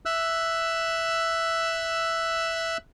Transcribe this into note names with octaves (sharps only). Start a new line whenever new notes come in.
E5 E6 F#6